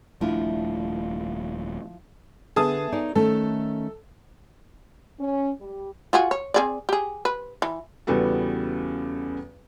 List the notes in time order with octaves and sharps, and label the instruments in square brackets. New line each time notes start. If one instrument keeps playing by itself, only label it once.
[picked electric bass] D#1 A3 D4 [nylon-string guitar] F3 E4 F4
[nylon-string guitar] D3 B3 E5 [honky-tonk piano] G#4 A5 D#6
[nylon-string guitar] D#4 C#5 D5
[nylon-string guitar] D#3 A3 C#4 [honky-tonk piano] A4
[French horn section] C#4
G3
[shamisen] F4 F#4 G#4
C#5
C4 G#4 D5
G4 G#4
B4
E3
[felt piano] E2 C#3 G3 B3 F#4 A4